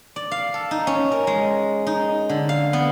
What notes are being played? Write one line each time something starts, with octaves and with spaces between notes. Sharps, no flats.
D5
F5
A4
D#4
C#4
A#4
G#3
D#4
D3
F5
B3